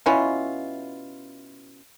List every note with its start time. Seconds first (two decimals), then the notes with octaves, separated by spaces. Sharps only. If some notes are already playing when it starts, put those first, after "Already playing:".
0.06 B2 C#4 E4 F4